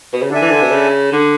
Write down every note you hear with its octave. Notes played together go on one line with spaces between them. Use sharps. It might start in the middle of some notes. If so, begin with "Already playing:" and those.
B2
C#3
D3 D4 A4 E5 G#5
E3
D3
B2
C#3
D3